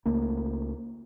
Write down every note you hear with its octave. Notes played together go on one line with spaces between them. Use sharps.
C#2 A3 A#3